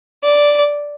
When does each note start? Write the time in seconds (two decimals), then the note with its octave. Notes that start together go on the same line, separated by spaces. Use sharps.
0.23 D5